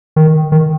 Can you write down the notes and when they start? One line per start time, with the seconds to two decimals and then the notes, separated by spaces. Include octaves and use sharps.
0.16 D#3
0.52 D#3